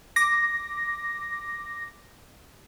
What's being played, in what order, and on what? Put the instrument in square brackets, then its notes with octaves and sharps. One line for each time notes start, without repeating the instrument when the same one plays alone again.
[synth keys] D6 A#6